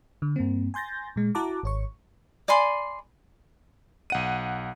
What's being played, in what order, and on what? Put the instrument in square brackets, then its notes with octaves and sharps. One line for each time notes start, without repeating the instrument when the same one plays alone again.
[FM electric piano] D3
G2 A#3 C4
G#5 C6 G6 A6 A#6
A#2 G#3
E4 F#4 F#5 A5 A#5 D6
G#1 C#5 C#6
[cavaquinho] D5 G#5 B5 C6
[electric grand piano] B1 F#5 D#7